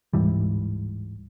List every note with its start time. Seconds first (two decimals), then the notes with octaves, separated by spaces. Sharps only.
0.13 D1 G#2 E3 G3